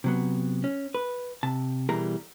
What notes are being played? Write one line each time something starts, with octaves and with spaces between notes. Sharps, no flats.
C3 F#3 B3
C#4
B4
C3 A5
B2 E3 G3 G#4 A#4 A#5